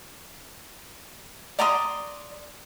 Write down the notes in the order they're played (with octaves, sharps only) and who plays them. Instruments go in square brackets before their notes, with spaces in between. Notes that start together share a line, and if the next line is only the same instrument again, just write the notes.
[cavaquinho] D5 A#5 C6 D#6